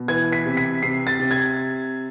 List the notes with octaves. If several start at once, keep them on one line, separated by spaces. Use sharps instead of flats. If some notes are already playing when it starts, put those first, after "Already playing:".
Already playing: B2
E3 G#6
B6
C3
B6
C3 C7
A6
C3
G#6